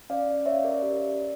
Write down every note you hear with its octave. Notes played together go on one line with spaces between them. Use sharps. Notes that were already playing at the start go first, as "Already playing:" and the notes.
C#4 D5 F5
C#4 C#5 E5
A#4 D5
G4